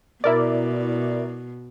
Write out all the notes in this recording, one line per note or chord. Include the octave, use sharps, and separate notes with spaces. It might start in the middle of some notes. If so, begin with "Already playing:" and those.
B2 E4 A#4 D5